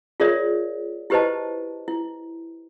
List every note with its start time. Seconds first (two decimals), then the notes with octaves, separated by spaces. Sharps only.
0.20 F4 G#4 A#4 C#5 D5 E5
1.10 E4 G4 B4 C5 D#5 A5
1.88 E4